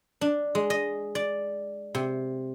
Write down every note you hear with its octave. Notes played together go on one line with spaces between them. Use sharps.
D4
G#3
D#5
D5
C3